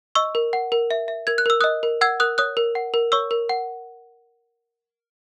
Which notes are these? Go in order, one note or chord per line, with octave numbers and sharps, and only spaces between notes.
D#5 C#6 E6
A#4
F#5
A#4
E5
E5
A#4 G#6
F#6
A#4 E6
D#5 D#6 F#6
A#4
F#5 E6 G#6
A#4 D#6 F#6
C#5 D#6 F#6
A#4
F#5
A#4
C#5 C#6 E6
A#4
F#5